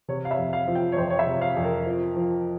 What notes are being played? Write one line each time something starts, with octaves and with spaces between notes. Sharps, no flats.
C3 C#5
F5
E5
F2
F5
F3
G5
C#5
F2 C5
C#5
E5
C3
F5
F2
A#4
F3
F3